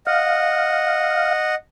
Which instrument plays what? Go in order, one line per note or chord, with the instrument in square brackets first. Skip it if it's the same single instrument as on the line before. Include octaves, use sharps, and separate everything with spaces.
[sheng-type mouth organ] D#5 F#5 [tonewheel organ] F5